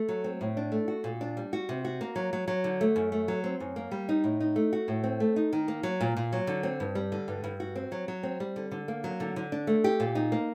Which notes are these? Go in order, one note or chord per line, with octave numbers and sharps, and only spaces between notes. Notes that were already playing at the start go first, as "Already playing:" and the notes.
Already playing: A3
F#3
C4
A2
D4
A3
F#4
A#2
D4
G3
F#4
C3
F#4
A#3
F#3
F#3
F#3
D3
A3
F#2
A3
F#3
C4
F#2
A#3
G3
D#4
A2
D#4
A3
F#4
A2
C4
A3
D#4
D#3
A#3
F#3
A#2
A#2
F#3
D3
C4
G2
G3
D3
G2
G2
F#4
C4
F#3
F#3
C4
G3
D3
D3
A#3
F#3
D3
D3
D4
A3
G4
A#2
D#4
A#3